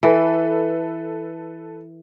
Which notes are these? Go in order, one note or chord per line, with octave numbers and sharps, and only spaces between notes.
E3 A4 B4